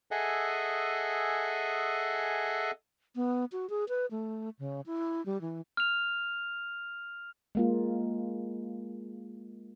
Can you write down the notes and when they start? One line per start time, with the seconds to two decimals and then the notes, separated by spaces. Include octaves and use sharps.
0.11 G#4 A4 D#5 E5 F#5 G#5
3.16 B3
3.52 F#4
3.70 G#4
3.89 B4
4.11 A3
4.59 C#3
4.86 E4
5.26 G3
5.41 E3
5.77 F6 F7
7.55 G#3 A#3 F4